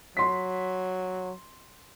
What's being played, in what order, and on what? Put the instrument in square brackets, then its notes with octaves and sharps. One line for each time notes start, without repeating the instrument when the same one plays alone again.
[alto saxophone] F#3 [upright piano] C6 B6